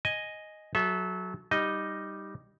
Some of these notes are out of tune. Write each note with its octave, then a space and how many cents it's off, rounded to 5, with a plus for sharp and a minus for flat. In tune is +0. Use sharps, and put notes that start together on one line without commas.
D#5 +0 G#5 +0
F#3 +0 A4 -30 E5 +0
G3 +0 D#4 +0 D#5 +0